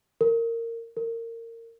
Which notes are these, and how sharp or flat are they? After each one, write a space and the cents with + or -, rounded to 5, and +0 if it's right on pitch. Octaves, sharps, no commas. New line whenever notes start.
A#4 -20
A#4 -25